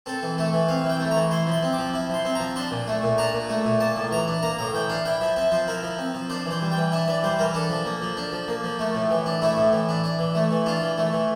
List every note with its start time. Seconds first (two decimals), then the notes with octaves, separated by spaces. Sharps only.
0.06 C4 A4
0.23 E3
0.38 A3 A4
0.53 E3
0.68 C4 F5
0.84 E3
0.90 G5
1.00 A3
1.11 E3 A#5
1.31 E4 C6
1.47 F3 C6
1.63 C4
1.73 D6
1.79 F3
1.94 E4
2.09 F3 C6
2.25 C4
2.35 F3 A#5
2.56 D4 C6
2.71 A#2
2.87 A3
3.03 A#2
3.18 D4 A#5
3.34 A#2
3.49 A3
3.65 A#2
3.80 A#3 A5
3.96 A2
4.11 E3 A#5
4.28 D4
4.43 A#3 A#5
4.59 A2 A#5
4.74 E3 G5
4.89 D4 F5
5.05 E4 G5
5.21 F3 E5
5.36 C4 E5
5.52 F3 C5
5.68 E4 A#4
5.83 F3
5.98 C4
6.14 F3
6.29 D4 C5
6.46 E3
6.51 C5
6.62 G3
6.72 G5
6.77 E3
6.92 D4 E5
7.08 E3 D5
7.23 G3 C5
7.39 E3 A#4
7.54 D4 A4
7.70 F3
7.85 A#3
8.02 F3
8.17 D4
8.32 F3
8.48 A#3
8.64 F3
8.79 A3
8.95 A2
9.10 E3
9.26 D4
9.42 A3 E4
9.57 A2
9.73 E3
9.89 D4
10.04 D4
10.19 E3
10.35 A3
10.51 E3
10.66 D4 F4
10.82 E3
10.98 A3
11.13 E3